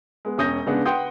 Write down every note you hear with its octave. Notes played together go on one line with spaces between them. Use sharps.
G#3 B3
E1 C#4 D#6 G6 A#6
C#3 G#3 B3 D4
B4 F#5 G5 C6 D#6 G6